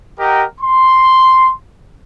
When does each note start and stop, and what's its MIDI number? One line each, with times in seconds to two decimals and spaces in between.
0.19 0.45 67
0.19 0.45 70
0.19 0.45 75
0.19 0.45 78
0.19 0.45 79
0.19 0.45 82
0.61 1.51 84